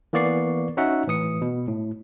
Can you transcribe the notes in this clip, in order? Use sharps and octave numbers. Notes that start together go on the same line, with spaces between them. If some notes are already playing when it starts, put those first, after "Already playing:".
E3 A#3 B3 D5 C#6 C7
C#4 D#4 F#4 E5 F#5
A2 E3 D#6 C#7
B2
A2